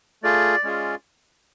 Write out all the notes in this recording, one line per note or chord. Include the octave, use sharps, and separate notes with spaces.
A3 F4 G#4 D5
G#3 C#4 F4 G#4